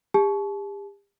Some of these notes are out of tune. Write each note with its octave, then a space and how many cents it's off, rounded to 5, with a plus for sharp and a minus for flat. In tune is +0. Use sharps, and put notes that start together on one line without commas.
G4 +40 A5 -35